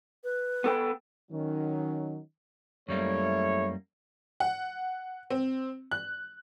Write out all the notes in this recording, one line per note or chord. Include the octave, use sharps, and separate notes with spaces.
B4
B3 A4 G5
D#3 F#3 C#4 D#4
F#2 G3 A3 A#3 E4 C#5
F#5
C4
F#6